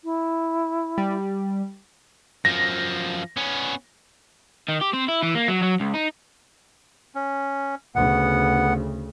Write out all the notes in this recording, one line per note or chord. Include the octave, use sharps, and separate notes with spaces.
E4
G3
F#2 F3 A#6
B3 C#4
D#3
G4
C4
E4
E3
A#3
F#3
F#3
C#2
D#4
C#4
D2 C#3 B3 F#5